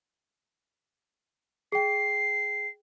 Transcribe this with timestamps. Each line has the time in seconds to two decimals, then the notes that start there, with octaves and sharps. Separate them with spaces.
1.72 G#4 G5 C7